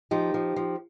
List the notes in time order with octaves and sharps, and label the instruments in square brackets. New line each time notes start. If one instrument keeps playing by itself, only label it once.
[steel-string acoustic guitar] F3 D#4 G4
F3
F3